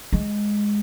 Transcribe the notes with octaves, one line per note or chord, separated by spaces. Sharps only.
G#3